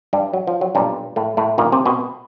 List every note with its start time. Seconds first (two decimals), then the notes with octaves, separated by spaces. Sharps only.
0.13 G2 G3
0.34 F#3
0.48 F3
0.61 F#3
0.75 B1 G2 A#2 G3
1.16 A2 A3
1.37 A2 A3
1.58 G1 F#2 A#2 D#3 A#3
1.72 C3 C4
1.86 B2 B3